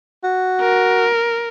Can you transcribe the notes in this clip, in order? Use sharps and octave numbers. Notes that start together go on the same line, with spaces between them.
F#4
A#4